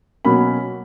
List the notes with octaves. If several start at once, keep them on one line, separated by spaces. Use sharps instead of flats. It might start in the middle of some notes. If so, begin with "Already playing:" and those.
B2 F#3 A#3 C#4 B5